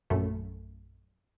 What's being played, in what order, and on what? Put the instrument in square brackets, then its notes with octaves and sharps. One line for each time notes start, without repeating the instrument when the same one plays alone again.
[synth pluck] A#1 F#2 A3